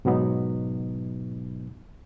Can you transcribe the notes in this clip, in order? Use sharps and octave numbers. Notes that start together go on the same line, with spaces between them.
G#2 B2 F#3 B3 D#4